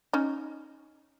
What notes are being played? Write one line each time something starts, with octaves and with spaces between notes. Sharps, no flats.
C#4 D#4